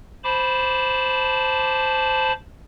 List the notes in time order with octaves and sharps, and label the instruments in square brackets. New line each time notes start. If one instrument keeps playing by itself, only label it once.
[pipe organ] C5 A5 B5 D6